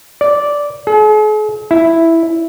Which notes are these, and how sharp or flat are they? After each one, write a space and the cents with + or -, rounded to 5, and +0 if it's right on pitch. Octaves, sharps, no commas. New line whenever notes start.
D5 -10
G#4 +45
E4 +0